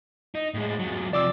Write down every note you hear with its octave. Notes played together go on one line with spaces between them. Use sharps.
D#4
A2 G#3
E2 F#3
C3 F3 D5 D6 E6